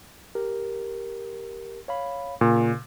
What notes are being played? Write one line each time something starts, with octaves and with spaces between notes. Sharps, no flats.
G4 A#4
C#5 F5 B5
A#2 C#3